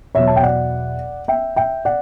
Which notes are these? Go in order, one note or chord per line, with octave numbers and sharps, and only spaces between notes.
E2 B2 F#3 C#5 E5
A5
G5
D5 F#5
E5 G5
E5 G5
D5 F#5